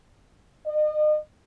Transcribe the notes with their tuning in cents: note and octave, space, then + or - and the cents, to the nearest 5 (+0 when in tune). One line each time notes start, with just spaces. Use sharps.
D#5 -40